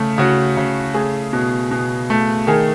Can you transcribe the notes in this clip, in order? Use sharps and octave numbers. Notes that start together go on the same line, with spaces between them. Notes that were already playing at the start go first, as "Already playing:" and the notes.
Already playing: C#3 A3
C#3 F#4
C#3
A3 G#4
B2
B2
A3
D#3 G#4